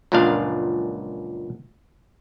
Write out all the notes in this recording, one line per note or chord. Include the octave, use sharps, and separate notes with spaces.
C#2 F#2 A#2 F3 D4 F5